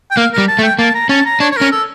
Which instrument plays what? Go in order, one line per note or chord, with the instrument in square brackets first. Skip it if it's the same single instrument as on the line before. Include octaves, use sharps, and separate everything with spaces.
[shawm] G5
[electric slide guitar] A#3 [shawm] F5
[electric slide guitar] G3 [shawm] A#4
[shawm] A5
[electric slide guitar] A3
[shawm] G5
[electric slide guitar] A#3 [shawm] A5
[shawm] A#5
[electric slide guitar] C#4 [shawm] A5
[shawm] A#5
[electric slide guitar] D4 [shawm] C#5
[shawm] C#5
[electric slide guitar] C#4 [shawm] A#4
[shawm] A4